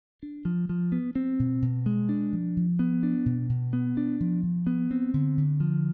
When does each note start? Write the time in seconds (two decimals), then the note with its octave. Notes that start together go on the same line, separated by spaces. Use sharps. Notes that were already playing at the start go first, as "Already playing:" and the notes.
0.23 D4
0.45 F3
0.69 F3
0.92 B3
1.15 C4
1.39 B2
1.62 B2
1.86 G#3
2.09 D4
2.33 F3
2.57 F3
2.79 B3
3.03 D4
3.26 B2
3.49 B2
3.73 B3
3.97 D4
4.20 F3
4.43 F3
4.67 B3
4.91 C4
5.14 D3
5.37 D3
5.60 F3